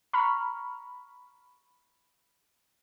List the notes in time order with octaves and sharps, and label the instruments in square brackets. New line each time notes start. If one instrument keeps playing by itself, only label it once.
[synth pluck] A#5 B5 C#6 F6